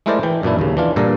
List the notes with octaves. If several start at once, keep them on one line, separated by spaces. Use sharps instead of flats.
G#3 A3 E4 A#4 C5 D5
E3 G5
F#2 A#2 D4 E4
D#2 C#3
E3 D4 F4
G2 A#2 A4 D5 A#5